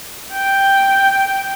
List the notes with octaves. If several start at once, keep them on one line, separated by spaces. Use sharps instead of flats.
G5